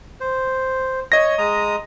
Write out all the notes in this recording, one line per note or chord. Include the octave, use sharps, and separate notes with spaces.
C5
C#5 D#5 A#6
G#3 A#5 D#6